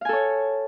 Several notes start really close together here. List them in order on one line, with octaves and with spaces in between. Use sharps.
F5 G#5 A4 C#5